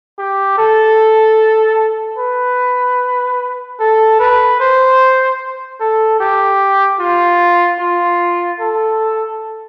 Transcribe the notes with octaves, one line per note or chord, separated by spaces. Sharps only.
G4
A4
B4
A4
B4
C5
A4
G4
F4
F4
A4